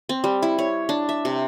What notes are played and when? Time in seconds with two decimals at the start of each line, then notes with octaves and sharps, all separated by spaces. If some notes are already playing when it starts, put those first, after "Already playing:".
0.09 C4
0.24 G3
0.43 E4
0.58 C#5
0.89 D4
1.09 E5
1.25 C3